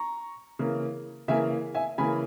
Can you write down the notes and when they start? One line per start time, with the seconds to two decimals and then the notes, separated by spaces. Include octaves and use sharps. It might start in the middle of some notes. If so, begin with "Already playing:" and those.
Already playing: A#5 C#6
0.59 C#3 E3 A#3
1.28 C#3 E3 A#3 E5 G#5
1.75 E5 G#5
1.98 C#3 E3 A#3 G#5 B5